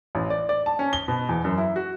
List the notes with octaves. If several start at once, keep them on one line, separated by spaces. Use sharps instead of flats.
A1
D5
D5
A5
C#4
G7
B2
E2
F#2
E4
F#4